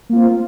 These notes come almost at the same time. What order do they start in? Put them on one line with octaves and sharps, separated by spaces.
A#3 F4 C4